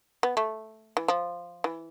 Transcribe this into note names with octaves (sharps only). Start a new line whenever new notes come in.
B3
A3
E3
F3
E3